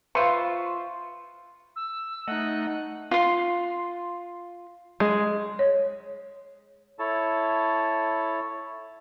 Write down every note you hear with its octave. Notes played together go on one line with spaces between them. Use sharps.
F4 B4 C5 E5 F5 C6 C#6
E6
A3 D#4 D#5 F#5 F#6
F4 C6
G#3
C#5
E4 A4 C#5 A5